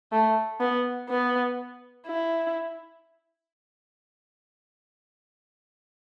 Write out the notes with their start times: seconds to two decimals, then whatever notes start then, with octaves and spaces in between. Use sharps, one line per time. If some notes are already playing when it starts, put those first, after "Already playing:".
0.12 A3
0.60 B3
1.09 B3
2.07 E4